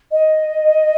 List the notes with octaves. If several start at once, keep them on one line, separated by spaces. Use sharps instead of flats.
D#5